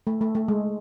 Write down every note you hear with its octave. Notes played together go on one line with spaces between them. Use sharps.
A3
A3
A3
G#3